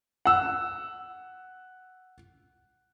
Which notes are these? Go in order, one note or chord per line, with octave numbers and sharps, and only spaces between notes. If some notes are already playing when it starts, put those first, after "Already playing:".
F#5 E6